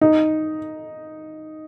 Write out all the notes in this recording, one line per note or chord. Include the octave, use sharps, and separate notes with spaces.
D#4